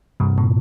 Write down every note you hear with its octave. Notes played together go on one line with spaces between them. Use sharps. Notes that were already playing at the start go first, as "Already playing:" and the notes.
G2 C3
A#2